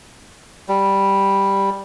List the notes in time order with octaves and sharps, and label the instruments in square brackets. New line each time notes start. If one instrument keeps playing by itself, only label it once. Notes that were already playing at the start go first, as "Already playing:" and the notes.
[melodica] G3